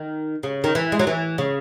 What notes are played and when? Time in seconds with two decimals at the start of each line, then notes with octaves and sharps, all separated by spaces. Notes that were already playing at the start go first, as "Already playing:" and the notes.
Already playing: D#3
0.43 C#3
0.64 D#3
0.75 E3
0.92 G#3
0.99 F#3
1.07 E3
1.38 C#3